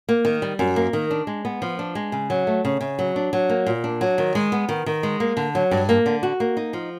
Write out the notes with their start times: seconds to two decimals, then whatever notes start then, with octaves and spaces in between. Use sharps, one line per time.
0.09 A#3
0.25 D#3
0.42 G3
0.59 F#2
0.76 A#3
0.93 D#3
1.11 D4
1.27 G#3
1.45 B3
1.62 F3
1.79 D4
1.95 G#3
2.12 C#3
2.30 F#3
2.47 A3
2.65 C#3
2.81 C#3
2.99 F#3
3.16 D4
3.33 F#3
3.49 A#3
3.66 A#2
3.84 D4
4.01 F#3
4.18 D#3
4.35 G#3
4.52 B3
4.69 D#3
4.86 D#3
5.03 G#3
5.20 A#3
5.37 D3
5.55 F#3
5.71 G2
5.89 A#3
6.06 D3
6.23 F#4
6.40 A#3
6.57 D#4
6.73 F3